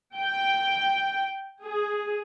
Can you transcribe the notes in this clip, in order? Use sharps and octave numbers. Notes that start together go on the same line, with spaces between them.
G5
G#4